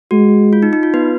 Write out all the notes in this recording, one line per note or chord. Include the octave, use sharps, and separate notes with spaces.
G#3 F#4
F4
D#4
D#4
F4
B3 B4